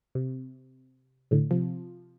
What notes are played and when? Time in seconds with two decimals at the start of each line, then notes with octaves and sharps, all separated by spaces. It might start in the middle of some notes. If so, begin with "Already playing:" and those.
0.15 C3
1.31 A2 D3
1.51 C3 F3